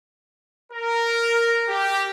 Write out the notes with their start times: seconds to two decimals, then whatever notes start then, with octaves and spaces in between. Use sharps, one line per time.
0.72 A#4
1.69 G4